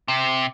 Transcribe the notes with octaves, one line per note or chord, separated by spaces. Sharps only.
C3